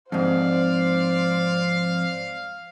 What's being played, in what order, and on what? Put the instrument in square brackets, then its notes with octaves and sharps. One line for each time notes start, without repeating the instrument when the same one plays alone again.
[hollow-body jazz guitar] F2 G#2 [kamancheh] C5 D5 [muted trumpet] F5